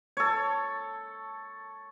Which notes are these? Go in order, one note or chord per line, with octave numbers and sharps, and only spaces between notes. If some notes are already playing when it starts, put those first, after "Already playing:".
A4 C#5